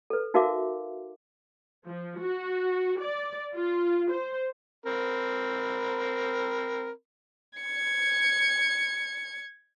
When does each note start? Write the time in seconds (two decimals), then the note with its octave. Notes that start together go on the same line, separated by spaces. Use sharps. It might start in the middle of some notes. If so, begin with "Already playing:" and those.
0.10 A4 B4
0.34 D#4 F#4 A#4 E5 F5 D6
1.86 F3
2.21 F#4
3.00 D5
3.56 F4
4.12 C5
4.86 C4 A#4 B5
7.59 G#6 C#7